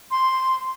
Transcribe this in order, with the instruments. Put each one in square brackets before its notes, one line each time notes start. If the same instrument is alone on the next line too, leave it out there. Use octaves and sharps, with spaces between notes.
[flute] C6